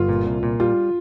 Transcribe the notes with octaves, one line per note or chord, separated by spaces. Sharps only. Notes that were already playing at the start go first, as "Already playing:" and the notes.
Already playing: G1 F4
A#2
C2
A#2
G3 F4